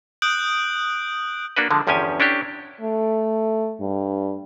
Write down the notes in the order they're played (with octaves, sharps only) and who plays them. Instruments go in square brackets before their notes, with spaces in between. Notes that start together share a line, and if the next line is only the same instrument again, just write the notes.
[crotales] D#6 F#6 G6 D7 F#7
[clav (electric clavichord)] A#3 D4 F#4 B4
D3 F3 G#3
G1 E2 F3 C#4 G4 G#5
C#4 D4 E4 G4
[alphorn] A3
G2